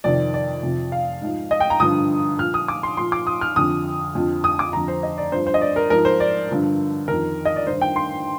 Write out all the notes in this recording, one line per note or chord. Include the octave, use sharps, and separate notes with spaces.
F2 C3 D#3 D5
D5
F2 C3 F3
F5
G#2 F3
D#5
G5
A#5
G2 D3 F3 D#6
A#2 F3 F6
D#6
D6
C6
A#2 F3 C6
D6
D#6
F6
F2 D3 F3 D#6
F2 D3 F3
D#6
D6
F2 D3 F3 A#5
C5
D#5
D5
G2 F3 C5
C5
D#5
D5
A#4
G#2 F3 A#4
C5
D5
G2 D3 F3
F2 D#3 A#4
D#5
D5
G2 D#3 C5
G5
C6